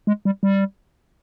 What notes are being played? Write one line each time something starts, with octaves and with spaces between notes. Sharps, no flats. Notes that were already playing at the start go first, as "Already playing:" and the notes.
G#3
G3
G3